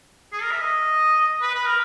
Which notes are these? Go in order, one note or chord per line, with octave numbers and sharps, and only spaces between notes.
G#4
A#4
E5
D#5
B4
B4
A#4